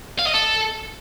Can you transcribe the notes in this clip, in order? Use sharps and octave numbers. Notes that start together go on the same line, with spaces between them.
F5
D#5
A4